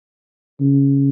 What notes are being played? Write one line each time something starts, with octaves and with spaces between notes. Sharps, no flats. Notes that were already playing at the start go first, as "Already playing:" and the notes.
C#3